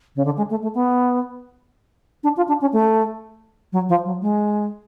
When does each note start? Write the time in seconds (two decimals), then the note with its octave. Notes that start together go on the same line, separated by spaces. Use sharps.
0.16 C#3
0.25 D3
0.37 G#3
0.50 A3
0.62 A3
0.74 B3
2.23 D4
2.36 F4
2.48 D4
2.61 C#4
2.72 A3
3.72 F#3
3.89 F3
4.05 F#3
4.21 G#3